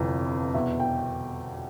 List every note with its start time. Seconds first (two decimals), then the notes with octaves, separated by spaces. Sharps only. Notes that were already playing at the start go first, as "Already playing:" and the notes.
Already playing: G1 F2 C3 E3
0.53 E2 B2 E5
0.80 G5